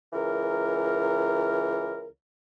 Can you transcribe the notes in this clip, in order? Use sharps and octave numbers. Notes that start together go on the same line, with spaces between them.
C#2 E3 A#4